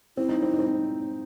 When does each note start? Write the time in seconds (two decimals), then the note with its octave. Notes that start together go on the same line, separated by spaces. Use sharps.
0.17 C4 E4
0.29 D#4
0.42 C4
0.54 D#4
0.59 C4